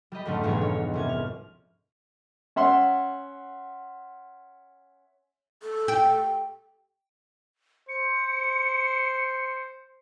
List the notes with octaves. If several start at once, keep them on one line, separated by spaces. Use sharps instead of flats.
G3 G4 D#5 B5
F2 G#2 D3 G3 A3 C#4
E1 B1 F2 G#2 F5 G#6
C#5
C2 C#4 G#6
F6
C#4 E5 F#5 C6
A4
G4
C5 C#7